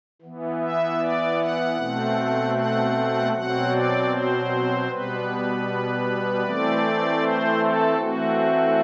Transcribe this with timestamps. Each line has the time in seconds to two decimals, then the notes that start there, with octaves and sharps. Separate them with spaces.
0.22 E3 B3
0.61 E5
1.00 D5
1.38 F#5
1.77 B2 A3 C4
2.55 F#5
3.32 B2 F#3 C4 F#5
3.72 D5
4.10 C5
4.88 B2 G3 B3 B4
6.43 E3 A3 C4 D5
7.21 C5
7.60 A4
7.99 E3 A3 C4 F#4